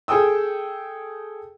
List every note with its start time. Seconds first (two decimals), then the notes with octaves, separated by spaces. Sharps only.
0.08 G#4 A4 G5 D#6 E6